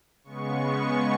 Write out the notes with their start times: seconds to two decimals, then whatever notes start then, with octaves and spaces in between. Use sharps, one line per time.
0.24 C#3 G#3 B3 C#6